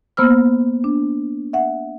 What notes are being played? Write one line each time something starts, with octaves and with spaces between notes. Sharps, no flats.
A#3 B3 C5 E6 F6
D4
E5 F#5